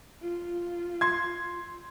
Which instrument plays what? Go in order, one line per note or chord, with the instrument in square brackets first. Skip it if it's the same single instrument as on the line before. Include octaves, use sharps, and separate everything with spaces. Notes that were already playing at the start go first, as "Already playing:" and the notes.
[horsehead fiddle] F4
[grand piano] C6 G#6